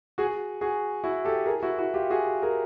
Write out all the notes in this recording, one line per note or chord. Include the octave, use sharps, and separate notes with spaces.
F#4 G#4
F#4 G#4
E4 F#4
G4 A4
G#4 A#4
E4 F#4
E4 F#4
F4 G4
F#4 G#4
G#4 A#4